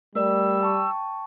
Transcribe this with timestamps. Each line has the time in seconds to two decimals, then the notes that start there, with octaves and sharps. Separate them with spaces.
0.15 G3 A3 A#4 D5 E6
0.61 G5 A5 C#6